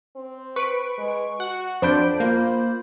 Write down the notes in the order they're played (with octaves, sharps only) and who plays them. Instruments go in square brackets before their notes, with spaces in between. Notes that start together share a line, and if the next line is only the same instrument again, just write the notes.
[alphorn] C4
[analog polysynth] B4 D7 [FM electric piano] C#6
[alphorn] G#3
[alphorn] F#4 [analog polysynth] F#5
[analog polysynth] F2 D4 D7 [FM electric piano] C5 B5 G6
[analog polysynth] A#3 [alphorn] F4